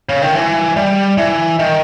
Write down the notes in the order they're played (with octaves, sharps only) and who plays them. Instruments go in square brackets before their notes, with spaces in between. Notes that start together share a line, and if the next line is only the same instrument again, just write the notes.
[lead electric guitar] C#3
D#3
E3
G3
E3
D#3